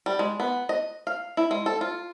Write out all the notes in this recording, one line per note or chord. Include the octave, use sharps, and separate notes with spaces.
G3
G#3
B3
D#5
F5
E4
G#3
A4
F4